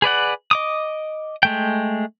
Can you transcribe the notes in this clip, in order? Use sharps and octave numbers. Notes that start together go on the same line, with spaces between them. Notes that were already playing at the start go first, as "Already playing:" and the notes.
G#4 B4 D5 F#5
D#5 D6 D#6
G#3 A3 G5